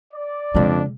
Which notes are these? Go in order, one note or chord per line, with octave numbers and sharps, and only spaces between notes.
D5
F2 C#3 G#3 D4